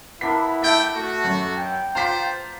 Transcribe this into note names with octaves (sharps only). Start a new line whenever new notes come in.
B3 D4 E4 A#4 B6
A3 E5 G5 A5 B5 G6
A3 F#4
F#2
G5
F4 C5 D5 A#5 B6